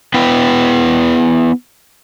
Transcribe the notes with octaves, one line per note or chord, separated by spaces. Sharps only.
B3 E4 B4 G5